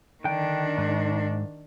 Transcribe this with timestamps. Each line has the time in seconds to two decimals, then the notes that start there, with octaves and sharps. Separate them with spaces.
0.24 D3 D#3 D4 G5
0.78 G#2